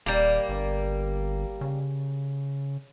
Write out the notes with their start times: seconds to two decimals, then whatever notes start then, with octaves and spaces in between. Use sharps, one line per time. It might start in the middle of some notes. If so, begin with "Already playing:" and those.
0.06 D#1 G3 A#3
0.49 G1
1.61 C#3